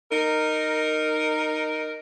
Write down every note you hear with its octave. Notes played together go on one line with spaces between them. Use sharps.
D#4 A#4